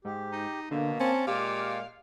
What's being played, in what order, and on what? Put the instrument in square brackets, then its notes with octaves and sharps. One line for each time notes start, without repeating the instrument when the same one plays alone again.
[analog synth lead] G#2 [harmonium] G4
[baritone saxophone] D#4
[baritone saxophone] B2 [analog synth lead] D3 [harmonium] A#3
[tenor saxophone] C4 [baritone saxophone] C#4 [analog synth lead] A5
[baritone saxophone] A#2 [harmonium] G#3 [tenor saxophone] G4 [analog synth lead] F5